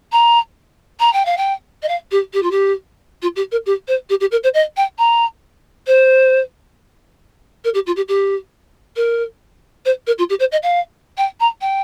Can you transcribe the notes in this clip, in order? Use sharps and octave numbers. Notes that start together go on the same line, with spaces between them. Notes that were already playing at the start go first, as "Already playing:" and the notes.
A#5
A#5
G5
F5
G5
D#5
F5
G4
G4
F4
G4
F4
G4
A#4
G4
C5
G4
G4
A#4
C5
D#5
G5
A#5
C5
A#4
G4
F4
G4
G4
A#4
C5
A#4
F4
G4
C5
D#5
F5
G5
A#5
G5